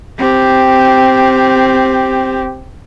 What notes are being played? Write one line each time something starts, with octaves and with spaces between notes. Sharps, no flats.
C4 G4